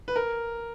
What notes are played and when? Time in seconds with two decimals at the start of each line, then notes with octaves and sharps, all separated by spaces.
0.08 B4
0.16 A#4